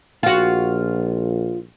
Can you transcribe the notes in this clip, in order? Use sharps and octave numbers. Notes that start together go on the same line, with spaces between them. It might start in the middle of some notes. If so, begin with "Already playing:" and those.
A#1 F4 F#4